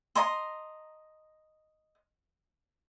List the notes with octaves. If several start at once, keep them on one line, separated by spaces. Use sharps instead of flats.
D#5 A#5 C6